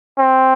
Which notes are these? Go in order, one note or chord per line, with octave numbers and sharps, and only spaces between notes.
C4